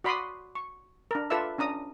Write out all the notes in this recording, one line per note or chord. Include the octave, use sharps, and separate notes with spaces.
F#4 D5 B5 C6 D6 D#6
C#6
D4 A#4
F4 A4 B4 D5 E5 E6
C#4 D4 A#5 D#6